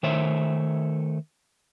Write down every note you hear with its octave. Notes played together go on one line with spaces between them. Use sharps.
D#3 A3 C5 C#5 E5